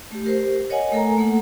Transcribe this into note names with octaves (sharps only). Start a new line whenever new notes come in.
A3 G4
G4 A#4 C5
A#4 C#5 D#5 F#5 G#5
A3 A4 A#4 G#5 A#5
A3 A#3 A4 F#5